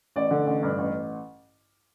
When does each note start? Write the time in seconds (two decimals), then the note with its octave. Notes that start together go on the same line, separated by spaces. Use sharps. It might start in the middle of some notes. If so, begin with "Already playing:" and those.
0.16 A1 D5
0.31 D3
0.47 A1
0.63 G2
0.78 A1